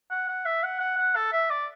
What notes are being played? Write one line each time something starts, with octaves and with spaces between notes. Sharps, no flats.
F#5
F#5
E5
F#5
F#5
F#5
A4
E5
D5